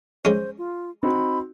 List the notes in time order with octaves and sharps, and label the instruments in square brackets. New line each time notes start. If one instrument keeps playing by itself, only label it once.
[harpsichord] G#3 C#4 [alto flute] C5
[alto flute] F4
[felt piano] C4 D#4 F#4 [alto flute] B5